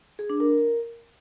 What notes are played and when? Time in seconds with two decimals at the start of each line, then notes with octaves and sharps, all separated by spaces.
0.19 G#4
0.30 D4
0.40 A#4